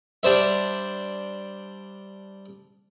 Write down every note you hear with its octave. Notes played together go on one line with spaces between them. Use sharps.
G3 D4 C5 E5